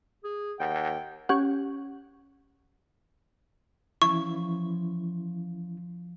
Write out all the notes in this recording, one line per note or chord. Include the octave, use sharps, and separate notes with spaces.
G#4
D#2 F#5 G5
C#4 G4 F#5
E3 F3 C#4 E4 C#6